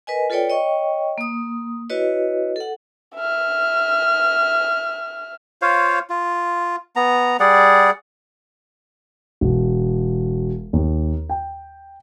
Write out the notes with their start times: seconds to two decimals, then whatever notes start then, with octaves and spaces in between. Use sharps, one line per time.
0.07 A#4 B4 D#5 G#5
0.30 F4 A4 B4 C#5 D5 G5
0.49 C#5 D#5 G5 C#6
1.18 A#3 D#6
1.90 E4 F#4 B4 C#5 D#5
2.56 A4 F#5
3.15 E5 F6
5.62 F4 C5 C#5 F5
6.10 F4
6.96 B3 A#5
7.40 G3 G#4 D5 F#5
9.41 E1
10.73 D#2
11.30 G5